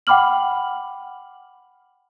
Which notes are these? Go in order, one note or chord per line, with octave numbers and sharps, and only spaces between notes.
F#5 G5 B5 D6 F6 F#7